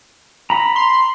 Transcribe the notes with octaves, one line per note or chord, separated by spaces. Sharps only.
A#5 B5
C6